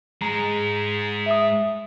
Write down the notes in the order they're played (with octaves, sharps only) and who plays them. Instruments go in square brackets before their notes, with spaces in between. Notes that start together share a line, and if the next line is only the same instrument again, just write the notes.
[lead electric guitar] G#2 G#3 [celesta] A#5
[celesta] E5 D#6